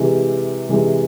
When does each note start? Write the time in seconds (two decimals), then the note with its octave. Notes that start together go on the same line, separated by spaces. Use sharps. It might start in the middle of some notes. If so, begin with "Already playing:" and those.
Already playing: C3 E3 G#3
0.69 C3 E3 G#3